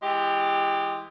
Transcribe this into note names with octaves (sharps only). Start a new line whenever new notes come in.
E3 G#3 G4